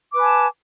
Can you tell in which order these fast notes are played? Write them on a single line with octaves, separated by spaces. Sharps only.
D6 B4 G#5 A5